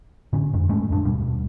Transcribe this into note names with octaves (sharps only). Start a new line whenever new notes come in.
A2 D3 C#4
F2 G#2
G#2 G#3 A3 C#4
D#1 F#2 D4
D#2 B2 G3